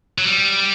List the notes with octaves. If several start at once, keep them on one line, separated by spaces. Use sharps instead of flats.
F#3
G3